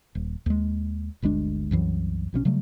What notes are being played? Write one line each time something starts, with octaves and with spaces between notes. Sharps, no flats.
D#1
D#2 G#3
G1 D2 G#3 D4
C2 F#2 E3 F#3
A#1 B2 G3 C#4
C#3 F#3 G3 A3